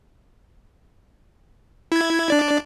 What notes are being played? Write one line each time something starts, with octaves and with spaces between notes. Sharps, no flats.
E4 G#6
D4 D5